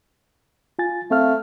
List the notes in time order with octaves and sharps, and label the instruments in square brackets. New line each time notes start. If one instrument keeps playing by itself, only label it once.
[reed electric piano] F4 G#5 A6
[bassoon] A3 [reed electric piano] C4 F5 F6